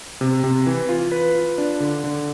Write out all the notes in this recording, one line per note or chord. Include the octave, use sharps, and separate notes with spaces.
C3
C3
E3
F4
B4
F4
D4
D3
D3